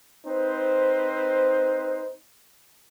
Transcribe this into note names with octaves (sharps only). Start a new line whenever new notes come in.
C4 D#4 B4 C5